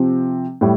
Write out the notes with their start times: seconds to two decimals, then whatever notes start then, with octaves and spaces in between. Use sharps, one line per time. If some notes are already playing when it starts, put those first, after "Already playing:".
Already playing: C3 F3 C4
0.61 A2 G3